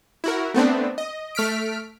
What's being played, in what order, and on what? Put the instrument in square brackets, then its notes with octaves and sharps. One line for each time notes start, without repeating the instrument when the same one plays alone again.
[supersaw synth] E4 F#4 A#4
A3 B3 C4 D4
D#5
A3 F6 B6 D7